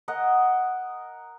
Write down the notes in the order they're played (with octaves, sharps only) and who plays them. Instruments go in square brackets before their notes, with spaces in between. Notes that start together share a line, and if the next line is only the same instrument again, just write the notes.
[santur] A#4 D#5 F#5